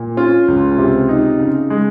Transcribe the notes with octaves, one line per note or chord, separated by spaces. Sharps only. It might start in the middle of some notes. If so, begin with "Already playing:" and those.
Already playing: A#2
C#4 F4
C#2
C3
D#4
C#3
G#3